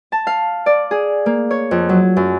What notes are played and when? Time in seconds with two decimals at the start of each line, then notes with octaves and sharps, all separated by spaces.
0.12 A5
0.27 F5
0.66 D5
0.91 G#4
1.26 A#3
1.51 C#5
1.71 F2
1.89 F#3
2.17 F#2